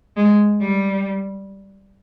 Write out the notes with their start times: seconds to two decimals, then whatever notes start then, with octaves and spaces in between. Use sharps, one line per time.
0.17 G#3
0.61 G3